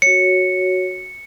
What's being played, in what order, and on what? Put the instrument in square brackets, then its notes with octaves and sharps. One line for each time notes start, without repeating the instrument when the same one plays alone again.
[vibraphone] F#4 C#5 [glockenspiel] C#7